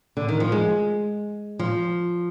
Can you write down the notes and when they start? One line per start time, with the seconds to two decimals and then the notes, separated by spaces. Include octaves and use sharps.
0.17 D3
0.29 D#3
0.40 F3
0.52 G#3
1.59 F3